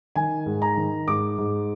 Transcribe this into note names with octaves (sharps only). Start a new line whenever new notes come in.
D#3 G#5
G#2
A#5
D#3
G#2 D6
G#2